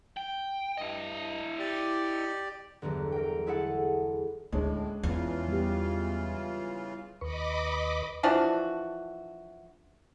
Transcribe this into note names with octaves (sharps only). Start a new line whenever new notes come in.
G5
G2 E4 D#5
G4 D5
G1 E2 D3 F#3
A#4 G5
G#3 E4 G#4 A4 F#5
D2 A2 G#3 C#4 D4
E2 C#3 E3 F4
G3 B3 G4
D#2 B4 D#5 B5 C#6 D6
E3 F3 D4 F#4